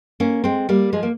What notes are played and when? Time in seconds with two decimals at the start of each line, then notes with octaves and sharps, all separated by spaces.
0.20 A#3 C#4
0.44 G#3 C4
0.69 G3 A#3
0.93 F3 G#3
1.03 A#3